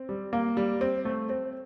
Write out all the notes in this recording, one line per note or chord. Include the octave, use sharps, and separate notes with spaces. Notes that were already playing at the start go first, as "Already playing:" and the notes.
Already playing: C4
G3
A#3
G3
C4
A3
C4